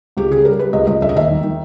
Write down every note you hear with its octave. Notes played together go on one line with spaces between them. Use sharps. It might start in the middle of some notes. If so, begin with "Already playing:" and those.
C#2 G4
C#3 G#4
G3 A#4
G3 B4
C#2 D#5
C#2 D#5
E1 E5
D#5
D#2 E5
D#3
D#3